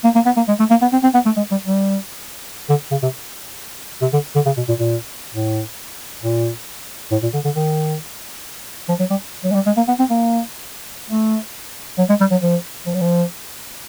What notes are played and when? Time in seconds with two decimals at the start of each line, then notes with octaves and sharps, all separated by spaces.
0.04 A#3
0.15 A#3
0.26 B3
0.37 A#3
0.48 G#3
0.59 A3
0.70 A#3
0.82 B3
0.92 C4
1.03 C4
1.14 B3
1.25 A3
1.37 G#3
1.51 G3
1.66 G3
2.69 D3
2.91 C#3
3.02 C3
4.02 C3
4.13 D3
4.35 D3
4.46 C#3
4.57 B2
4.68 A#2
4.79 A#2
5.34 A2
6.23 A#2
7.11 A2
7.23 A#2
7.34 D3
7.45 D3
7.56 D#3
8.89 F3
8.99 F#3
9.10 G3
9.44 F#3
9.51 G#3
9.55 G3
9.66 G#3
9.77 A#3
9.88 B3
9.99 C4
10.10 A#3
11.10 A3
11.98 F#3
12.09 G#3
12.20 G3
12.31 F#3
12.43 F3
12.86 F3
12.94 F#3
13.01 F3